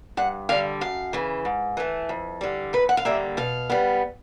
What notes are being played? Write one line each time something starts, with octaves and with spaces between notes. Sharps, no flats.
G2 F#5
D3 G3 F5
F#2 F5
C#3 E3
G#2
E3 A3
F2
D3 G3
D#2 B4
F#5
F5
D3 G3 A#3 E5
B2 F5
G3 B3